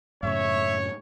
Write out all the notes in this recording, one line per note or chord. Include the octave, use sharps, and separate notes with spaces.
F#2 A2 C#3 C#5 E5